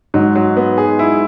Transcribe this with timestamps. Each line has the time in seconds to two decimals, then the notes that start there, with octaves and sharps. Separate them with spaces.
0.14 G#2 F#3
0.36 F#3
0.57 B3
0.78 G#4
0.99 E4